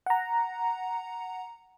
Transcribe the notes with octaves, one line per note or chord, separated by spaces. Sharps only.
F#5 A#5